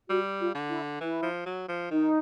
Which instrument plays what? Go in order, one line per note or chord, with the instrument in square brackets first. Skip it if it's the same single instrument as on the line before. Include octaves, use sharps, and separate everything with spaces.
[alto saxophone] G3 [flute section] F#4
[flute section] F4
[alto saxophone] D3
[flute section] E4
[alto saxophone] E3 [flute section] E4
[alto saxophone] F3
F#3
F3
[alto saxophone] D#3 [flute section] D#4